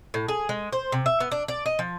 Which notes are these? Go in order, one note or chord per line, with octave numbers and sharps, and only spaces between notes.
A2
G#4
G#3
C5
C3
E5
B3
D4
D5
D#5
F3